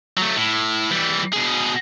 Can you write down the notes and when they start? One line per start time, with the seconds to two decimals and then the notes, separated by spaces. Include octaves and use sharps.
0.17 F#3 A3
0.37 A2
0.91 E3 G3
1.33 B2 G#4